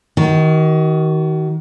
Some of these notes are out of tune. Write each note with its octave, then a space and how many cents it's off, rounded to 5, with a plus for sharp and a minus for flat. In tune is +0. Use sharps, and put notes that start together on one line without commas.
D#3 +20 F#4 +40